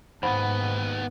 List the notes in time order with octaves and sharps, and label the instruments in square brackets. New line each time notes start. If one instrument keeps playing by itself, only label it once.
[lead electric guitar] D#2 B3 [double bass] G#2 [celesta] C5 F#5 B5